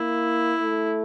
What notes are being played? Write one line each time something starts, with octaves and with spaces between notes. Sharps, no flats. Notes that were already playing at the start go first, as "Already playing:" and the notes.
Already playing: A#3 E4
A3